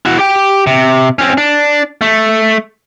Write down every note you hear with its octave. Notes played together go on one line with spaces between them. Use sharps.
E4 F#4
G4 G5
C3
C4 C#4
D4
A3